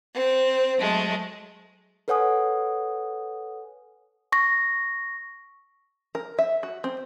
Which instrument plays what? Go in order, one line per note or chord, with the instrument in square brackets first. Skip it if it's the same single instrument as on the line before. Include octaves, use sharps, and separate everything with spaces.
[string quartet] C4
F#3 G#3 A3
[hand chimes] A4 B4 C#5 F#5 G#5 D#6
C#6 A#6
[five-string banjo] A#4
E5
F#4
C4